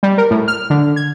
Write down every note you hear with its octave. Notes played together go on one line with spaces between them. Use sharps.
G3
A#4
A2
F6
D3
G#6